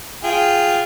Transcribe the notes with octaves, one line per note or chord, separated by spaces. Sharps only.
F4 G#4 G5